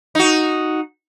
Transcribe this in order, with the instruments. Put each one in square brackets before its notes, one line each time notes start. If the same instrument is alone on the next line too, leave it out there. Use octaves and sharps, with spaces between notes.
[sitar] D#4 F#4